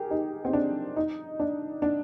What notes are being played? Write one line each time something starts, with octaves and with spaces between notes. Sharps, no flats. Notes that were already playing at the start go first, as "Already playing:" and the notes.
Already playing: G4 G#4 A#4
D#4
C4
D4
D#4
D4
D4